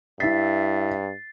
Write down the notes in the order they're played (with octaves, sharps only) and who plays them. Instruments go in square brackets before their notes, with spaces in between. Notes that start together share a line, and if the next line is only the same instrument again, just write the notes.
[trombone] G2 [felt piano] E4 B6 [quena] E5 [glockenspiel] A6 C7